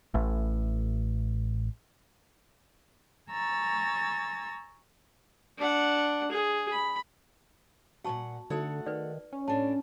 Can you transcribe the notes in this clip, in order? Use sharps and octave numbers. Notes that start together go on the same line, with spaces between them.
A1 A2
G#5 A#5 C#6 E6 A6
D4 F#5
G#4
B5
A#2 F3 F#4 F#5 A5 C#6
D3 A3 D#4 F#4 A4 F#5
D#3 B4 D5
C#4
A2 D4 A5